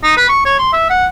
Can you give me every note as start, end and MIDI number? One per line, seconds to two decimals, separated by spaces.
0.04 0.16 63
0.17 0.25 71
0.29 0.42 85
0.45 0.55 73
0.59 0.72 84
0.73 0.86 76
0.90 1.06 78